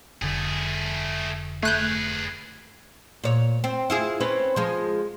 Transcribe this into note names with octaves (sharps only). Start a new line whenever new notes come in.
F1 D3 A3 G#4
A3 G#4 B4 F#6 G6
A#2 C#5
C4
E4 F4 G#4
C4 C#4 B4
F3 G#3